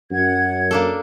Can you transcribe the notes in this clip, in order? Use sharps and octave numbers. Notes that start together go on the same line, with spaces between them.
F#2 F#5 G#6
A#3 D4 A4